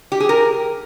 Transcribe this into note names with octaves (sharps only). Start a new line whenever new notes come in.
G4
G#4
A#4